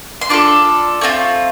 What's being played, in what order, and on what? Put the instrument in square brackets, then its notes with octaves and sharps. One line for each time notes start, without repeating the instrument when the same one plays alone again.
[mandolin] C6
D4 F4 A4 D6
A3 C4 F4